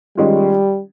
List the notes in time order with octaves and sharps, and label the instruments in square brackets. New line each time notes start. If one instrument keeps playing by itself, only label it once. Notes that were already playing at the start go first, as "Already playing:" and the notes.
[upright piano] D#3 G#3 C#4 F4 [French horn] G3